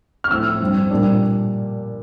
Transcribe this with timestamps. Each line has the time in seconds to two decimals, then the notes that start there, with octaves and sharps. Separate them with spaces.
0.24 F6
0.30 A2 F3 C4 E6
0.60 G2 F3 C4
0.91 A#2 G3 D4